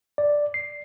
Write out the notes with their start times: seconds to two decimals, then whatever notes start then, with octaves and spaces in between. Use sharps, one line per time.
0.18 D5
0.54 C7